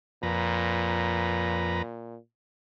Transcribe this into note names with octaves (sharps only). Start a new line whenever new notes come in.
F2 A#2 B4 A#5